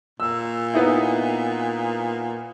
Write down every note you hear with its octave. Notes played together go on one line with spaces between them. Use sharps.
A#2 E6
B3 D#4 E4